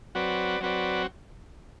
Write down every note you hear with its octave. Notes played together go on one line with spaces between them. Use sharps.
F#3 C4 F#4 B4 D5
F#3 C4 F#4 B4 D5